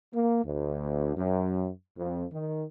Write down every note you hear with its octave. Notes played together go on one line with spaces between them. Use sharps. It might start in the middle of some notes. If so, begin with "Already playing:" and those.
A#3
D2
F#2
F2
D#3